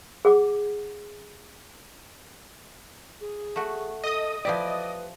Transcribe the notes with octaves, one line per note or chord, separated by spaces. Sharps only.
G#4 F#5 D6
G#4
A3 F#4
A4 D#5 D#6
F3 E4 G4 B4 D5